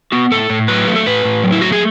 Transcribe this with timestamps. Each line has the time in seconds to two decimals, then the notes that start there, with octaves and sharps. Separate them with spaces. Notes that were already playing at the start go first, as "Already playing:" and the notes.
0.12 B3 F#4
0.32 A2 A4
0.50 A2
0.68 F#3 B4
0.88 A3
0.96 A4
1.06 A2 B4
1.25 A2
1.44 F#3
1.52 E4
1.61 A3 F#4
1.72 G#4